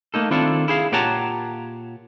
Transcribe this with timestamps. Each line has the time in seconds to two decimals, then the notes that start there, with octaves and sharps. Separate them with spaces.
0.14 A3 A#3 D#4 A4
0.31 D#3 C4 D4 E4 F4 A4
0.68 E4 G#4 F5
0.92 A#2 G4 C#5 F#5 A5 A#5